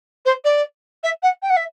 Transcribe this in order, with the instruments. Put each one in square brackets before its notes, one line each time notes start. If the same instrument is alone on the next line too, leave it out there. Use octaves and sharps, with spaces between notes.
[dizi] C5
D5
E5
F#5
G5
F#5
E5